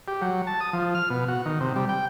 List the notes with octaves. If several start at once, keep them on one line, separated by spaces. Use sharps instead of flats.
G4
F#3
A5
D#6
F3
F6
B2
F#4
D#3
C3
G3
G5